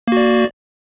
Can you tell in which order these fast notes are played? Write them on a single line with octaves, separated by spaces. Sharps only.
A#3 F#4 D5